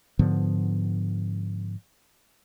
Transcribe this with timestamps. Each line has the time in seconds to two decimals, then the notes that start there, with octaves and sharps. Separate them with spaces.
0.19 G#2 D3 F3 B3